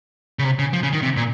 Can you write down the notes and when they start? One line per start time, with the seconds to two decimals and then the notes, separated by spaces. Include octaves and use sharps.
0.39 C#3
0.44 C3
0.59 C#3
0.73 F3
0.83 C#3
0.93 D#3
1.03 C3
1.17 A#2